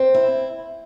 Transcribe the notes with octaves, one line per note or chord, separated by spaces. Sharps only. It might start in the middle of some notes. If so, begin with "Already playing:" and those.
Already playing: C4
E4